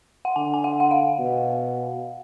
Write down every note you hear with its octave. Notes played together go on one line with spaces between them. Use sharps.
F#5
D3 G#5
G#5
F#5
F#5
F5
B2